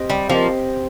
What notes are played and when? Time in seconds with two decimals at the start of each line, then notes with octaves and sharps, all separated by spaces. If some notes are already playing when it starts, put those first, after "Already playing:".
Already playing: C4 G4 D#5
0.10 G3
0.29 F3 A#3 C4 G4 D#5